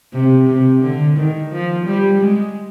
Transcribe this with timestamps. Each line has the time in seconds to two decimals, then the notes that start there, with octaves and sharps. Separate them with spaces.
0.13 C3
0.47 C3
0.82 D3
1.16 D#3
1.52 F3
1.86 G3
2.21 G#3